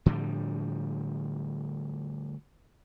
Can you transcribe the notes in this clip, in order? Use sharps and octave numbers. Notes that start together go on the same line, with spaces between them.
A2 D3 F3 G3